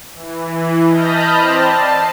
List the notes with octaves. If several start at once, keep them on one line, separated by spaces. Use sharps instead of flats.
E3
D#5 A5 B5 F6 G6 A#6
C4 C5 D5 A5
A5 C7